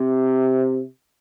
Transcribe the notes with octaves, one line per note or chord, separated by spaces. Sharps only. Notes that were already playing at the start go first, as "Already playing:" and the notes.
Already playing: C3